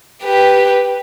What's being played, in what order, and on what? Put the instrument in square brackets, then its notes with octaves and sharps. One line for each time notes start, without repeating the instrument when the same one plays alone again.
[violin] G4 B4